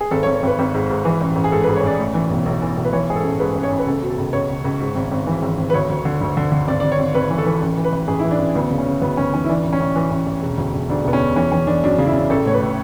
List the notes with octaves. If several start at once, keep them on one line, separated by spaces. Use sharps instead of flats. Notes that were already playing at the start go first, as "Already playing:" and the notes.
G#4
G#1 A4
C#5
G#1
C#5
G#1 B4
G#1
G#2
G#2
E3
A1
A1
G#4
G#2 A4
B4
G#2
C#5
A1 D5
A2
E3
B1
B1
E3
B1
B4
E3 C#5
G#2 G#4
A4
A1
G#2 B4
A1
C#5
A1
B4
C#2 A4
B2
A4
C#2
C#2 C#5
C#2
C#2
G#2
G#1
G#1
E3
G#1
G#1
B4
D2 C#5
D2
D3
D2
D3
D3
G#1 D5
G#1 D5
C#5
G#1
G#1 B4
E3
A4
E3
A1
E3
B4
A1
A1 G#4
E4
E3
D4
A1
D2 B3
C#3
C#4
C#3
D2 B3
D2 C#4
E3 C#4
E4
E3 D4
A1
C#4
A1
E3
A1
A1
E1
D2
E1
D2 D4
E1 B3
C#4
E1
E3 C#4
E3 C#4
E3 D4
F#2 D4
C#3
E4
C#3
A1 A4
A2 C#5
B4
A2